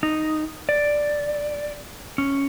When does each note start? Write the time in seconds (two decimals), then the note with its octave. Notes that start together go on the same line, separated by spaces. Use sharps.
0.03 D#4
0.69 D5
2.18 C#4